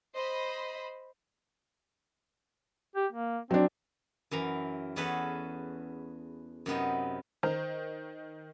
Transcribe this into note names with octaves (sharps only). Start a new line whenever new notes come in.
C5 D#5 B5
G4
A#3
F#3 C4 D4
F#2 E3 A#5
E2 C#4 F#4 G#4 A4 B4
F#2 C3 B3 D#4
D#3 C5 A#5